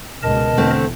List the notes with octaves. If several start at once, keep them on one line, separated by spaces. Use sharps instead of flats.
C#2 B2 A#4 D#5 A5
E2 D3 A3 C4